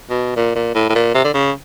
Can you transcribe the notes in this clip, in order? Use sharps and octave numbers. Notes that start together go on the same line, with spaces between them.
B2
A#2
A#2
A2
A2
A#2
C3
D3
C#3